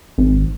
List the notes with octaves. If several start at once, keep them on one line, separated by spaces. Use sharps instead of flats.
G#1